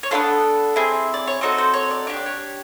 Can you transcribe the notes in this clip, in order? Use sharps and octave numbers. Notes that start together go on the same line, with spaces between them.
C#5
B3 D4 F4 A4 C5
C4 E4 G#4
D5
C#5
C4 D#4 F#4 A4 C5
C5
C#5
D5
D4 G4 C#5
D5
C#5